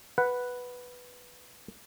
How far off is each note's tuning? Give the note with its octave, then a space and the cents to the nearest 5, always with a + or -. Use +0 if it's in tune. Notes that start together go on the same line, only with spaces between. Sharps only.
B4 +0 F#5 +0